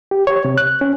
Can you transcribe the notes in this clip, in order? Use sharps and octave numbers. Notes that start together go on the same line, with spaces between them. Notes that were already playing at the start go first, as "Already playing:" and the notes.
G4
C#5
C3
F#6
C#4